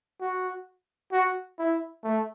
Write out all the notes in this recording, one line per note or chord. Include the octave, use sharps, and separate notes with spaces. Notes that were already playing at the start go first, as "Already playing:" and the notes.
F#4
F#4
E4
A3